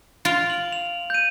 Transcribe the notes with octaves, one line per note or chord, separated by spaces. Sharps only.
F4 D7 F7
D7 F#7
F7
G6 D#7